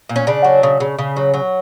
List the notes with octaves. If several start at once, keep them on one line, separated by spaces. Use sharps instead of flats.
A#2
C#4
C#3 D4
F#3
C#3
C#3
C#3
F#3
F#3